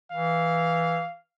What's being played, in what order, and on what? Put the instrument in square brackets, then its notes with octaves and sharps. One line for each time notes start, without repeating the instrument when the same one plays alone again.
[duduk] E3 [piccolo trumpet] F5